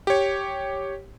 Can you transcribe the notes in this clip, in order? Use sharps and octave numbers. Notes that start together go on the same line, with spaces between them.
G4 C#5